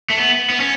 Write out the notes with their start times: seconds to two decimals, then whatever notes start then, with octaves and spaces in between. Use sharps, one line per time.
0.10 A3
0.17 B3
0.50 B3
0.60 C#4